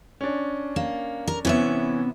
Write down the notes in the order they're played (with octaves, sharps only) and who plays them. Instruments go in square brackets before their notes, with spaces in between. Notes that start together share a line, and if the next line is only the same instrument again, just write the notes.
[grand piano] C#4 D4
[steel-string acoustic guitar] A#3
A#4
[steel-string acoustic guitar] C3 B3 E5 [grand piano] E3 C#4